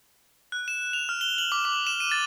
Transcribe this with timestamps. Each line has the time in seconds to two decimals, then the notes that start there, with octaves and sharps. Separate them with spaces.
0.52 F#6
0.68 E7
0.93 F7
1.09 F6
1.21 G7
1.38 F#7
1.52 D6
1.65 D6
1.87 E7
2.00 D#7
2.11 A6